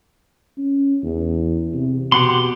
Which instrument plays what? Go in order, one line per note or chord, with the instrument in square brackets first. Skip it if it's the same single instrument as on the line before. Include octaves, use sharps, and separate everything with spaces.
[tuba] C#4
E2
C3
[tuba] B2 [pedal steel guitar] G4 F#5 C6